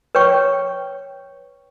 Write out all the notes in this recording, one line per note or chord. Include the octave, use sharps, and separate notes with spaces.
B4 C#5 G5 C#6